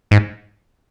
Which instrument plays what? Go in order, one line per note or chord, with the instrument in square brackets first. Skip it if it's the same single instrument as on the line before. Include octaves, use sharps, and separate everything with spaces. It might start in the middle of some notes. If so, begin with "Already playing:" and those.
[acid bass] G#2